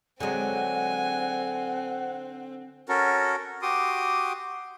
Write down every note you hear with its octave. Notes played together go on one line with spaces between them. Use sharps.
D3 F#3 G#3 C4 F#5 G#5
C#4 F#4 A4 A#4
F#4 G4 C6 D6 D#6